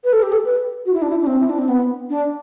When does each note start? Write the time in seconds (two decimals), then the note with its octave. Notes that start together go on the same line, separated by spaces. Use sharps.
0.04 B4
0.13 A4
0.23 G4
0.32 A4
0.45 B4
0.86 F#4
0.93 E4
1.02 D4
1.10 E4
1.21 D4
1.27 C4
1.40 E4
1.49 D4
1.58 C4
1.69 B3
2.10 D4